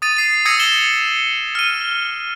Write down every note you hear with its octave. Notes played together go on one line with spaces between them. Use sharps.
D#6 A6 D#7
C7 D#7
D#6 E6 G#6 A#6 C#7 D#7
E7 G7
F6 D#7